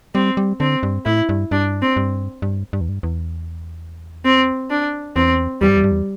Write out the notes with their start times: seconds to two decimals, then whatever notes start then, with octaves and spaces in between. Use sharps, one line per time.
0.15 G3 C4
0.37 G3
0.60 D3 C4
0.83 G2
1.05 A2 E4
1.29 G2
1.51 G2 D4
1.82 C4
1.97 G2
2.42 G2
2.73 G2
2.81 E2
2.89 G2
3.03 E2
4.25 C4
4.70 D4
5.16 E2 C4
5.61 E2 G3
5.69 G2
5.76 E2
5.84 G2
5.91 E2